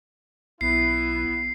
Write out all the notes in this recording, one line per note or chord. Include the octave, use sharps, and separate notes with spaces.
B1 B3 E4 C7